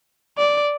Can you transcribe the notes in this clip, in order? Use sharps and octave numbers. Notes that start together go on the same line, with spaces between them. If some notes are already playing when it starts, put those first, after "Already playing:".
D5